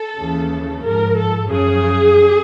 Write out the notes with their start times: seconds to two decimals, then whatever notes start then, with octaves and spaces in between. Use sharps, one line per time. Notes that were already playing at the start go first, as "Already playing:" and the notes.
Already playing: A4
0.18 D#2 C#3 E3
0.84 G#2 F3 A#4
1.17 A4
1.49 F#2 C#3 F3 G#4